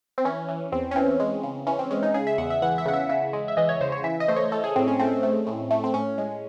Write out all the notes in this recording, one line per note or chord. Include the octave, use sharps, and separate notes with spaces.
C4
E3 C#4
E3
E2 C4
C#4
E3 C4
G#3
C#3
E3 C#4
C4
G#3 C#4
D#4
C#3 G#4
E5
E2 F#5
E5
E3 F#5
E5
C#3 F#5
E5
C#3 E5
G#3
E5
E3 D#5
C#5
C#3 C5
C#5
E3 E5
D#5
A3 C5
C#5
A3 A4
G#4
A2 C4
C#4
A3 C4
A3
A2
A3
C4
A2 C#4
G#3